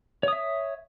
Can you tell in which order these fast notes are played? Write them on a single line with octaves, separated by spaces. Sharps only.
C#5 D#6 E5